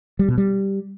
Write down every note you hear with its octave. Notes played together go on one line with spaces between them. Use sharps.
G3
B2
G3